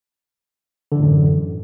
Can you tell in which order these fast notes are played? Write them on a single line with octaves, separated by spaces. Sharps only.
D3 E3 A2 F#2